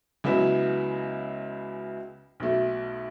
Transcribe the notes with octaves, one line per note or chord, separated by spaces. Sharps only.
C#2 C#3 F#3 B3 E4
B1 B2 A3